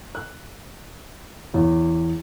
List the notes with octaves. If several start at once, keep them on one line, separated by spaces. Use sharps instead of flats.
F#6
E2 C#5